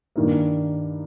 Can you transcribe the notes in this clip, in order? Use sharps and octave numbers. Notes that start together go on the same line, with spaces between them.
G2 D#3 A#3